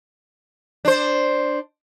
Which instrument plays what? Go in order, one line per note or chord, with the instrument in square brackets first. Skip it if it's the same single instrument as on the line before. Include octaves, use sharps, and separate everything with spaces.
[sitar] D4 C5